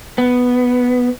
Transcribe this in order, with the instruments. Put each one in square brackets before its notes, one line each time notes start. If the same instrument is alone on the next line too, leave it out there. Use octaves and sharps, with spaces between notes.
[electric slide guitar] B3